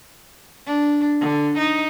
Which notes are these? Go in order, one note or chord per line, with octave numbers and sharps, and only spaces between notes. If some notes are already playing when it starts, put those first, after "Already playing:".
D4
D3
D#4